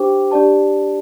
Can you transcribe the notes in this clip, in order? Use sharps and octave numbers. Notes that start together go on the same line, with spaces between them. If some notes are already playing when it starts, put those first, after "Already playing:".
Already playing: D4 G4 C5 G5 D6
D4 G4 D5 A5